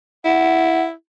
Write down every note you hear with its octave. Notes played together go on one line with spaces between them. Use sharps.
E4 F#5